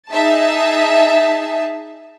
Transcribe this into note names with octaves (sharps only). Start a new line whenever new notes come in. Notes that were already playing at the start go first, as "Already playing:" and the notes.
D#4 G#4 E5 A5